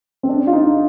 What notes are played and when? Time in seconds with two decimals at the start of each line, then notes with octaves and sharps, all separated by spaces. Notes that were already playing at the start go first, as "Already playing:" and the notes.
0.23 C4
0.29 D4
0.47 F4
0.53 D#4